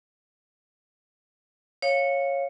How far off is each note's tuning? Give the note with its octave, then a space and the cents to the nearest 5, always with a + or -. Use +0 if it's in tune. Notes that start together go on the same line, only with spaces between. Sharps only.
C#5 -10 F5 +0